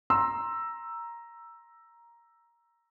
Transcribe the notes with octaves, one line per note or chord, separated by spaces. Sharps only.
A#5 C6 E6